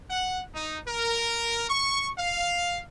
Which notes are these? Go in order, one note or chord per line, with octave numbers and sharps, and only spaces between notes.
F#5
D#4
A#4
C#6
F5